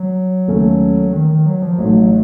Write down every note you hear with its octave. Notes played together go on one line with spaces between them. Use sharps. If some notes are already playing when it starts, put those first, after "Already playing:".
Already playing: F#3
D#2 C#3 A3 C#4
D#3
D#3
F#3
F3
A1 A2 F#3 A3 D#4 F#4